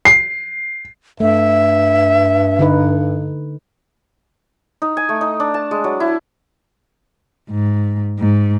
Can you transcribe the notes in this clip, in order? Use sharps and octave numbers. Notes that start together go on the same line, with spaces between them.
C7
G2 A3 E5
D3 D#4 B4
D#4
G#5
A3
D#4
D4
A5
G#3
F#3
E4
G#2
G#2